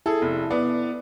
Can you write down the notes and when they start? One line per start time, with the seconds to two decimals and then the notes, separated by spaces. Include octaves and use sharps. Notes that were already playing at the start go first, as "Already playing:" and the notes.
0.06 E4 G#4 A4
0.22 F1
0.50 B3 D5